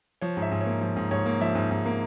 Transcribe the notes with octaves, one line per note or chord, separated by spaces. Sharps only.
F3 C#5
G#2
E5
G#2
C#5
A#3
F3
G#2
G#2 C#5
A#3
F3 E5
G#2
G#2
A#3